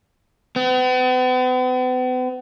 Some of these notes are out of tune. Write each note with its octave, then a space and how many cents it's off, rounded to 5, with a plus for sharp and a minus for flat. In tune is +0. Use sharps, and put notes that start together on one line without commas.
B3 +45